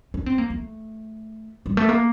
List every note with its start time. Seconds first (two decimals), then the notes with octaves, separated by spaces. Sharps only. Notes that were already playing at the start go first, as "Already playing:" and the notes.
0.14 D4
0.26 C4
0.38 A#3
0.50 A3
1.66 G3
1.77 A3
1.89 A#3